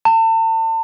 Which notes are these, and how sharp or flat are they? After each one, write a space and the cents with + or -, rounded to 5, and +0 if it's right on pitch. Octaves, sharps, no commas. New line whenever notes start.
A5 +40